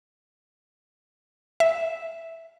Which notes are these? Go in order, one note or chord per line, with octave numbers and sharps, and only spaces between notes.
E5